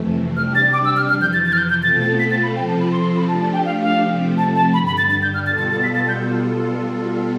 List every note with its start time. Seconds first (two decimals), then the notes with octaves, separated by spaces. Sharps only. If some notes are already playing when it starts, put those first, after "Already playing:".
Already playing: F2 C3 E3 A3
0.37 C3 G3 D4 G4 F6
0.55 A6
0.73 D6
0.85 E6
0.97 F6
1.09 F2 C3 E3 F6
1.21 G6
1.33 A6
1.46 A6
1.53 F6
1.58 G6
1.70 G6
1.82 B2 A3 C4 F4 A4 A6
2.01 A6
2.19 B6
2.31 A6
2.43 B5
2.55 C3 F3 C4 F4 A4 G5
2.68 A5
2.80 B5
2.92 C6
3.03 C6
3.16 B5
3.28 F3 A3 D4 G4 A5
3.40 A5
3.53 G5
3.65 F5
3.83 F5
4.02 C3 F3 A3 C4
4.37 A5
4.55 A5
4.74 G2 D3 G3 B5
4.87 B5
4.98 A6
5.10 A6
5.23 G6
5.34 F6
5.46 B2 G3 B3 F4 A4 A6
5.59 A6
5.71 A6
5.83 B6
5.95 A6
6.08 G6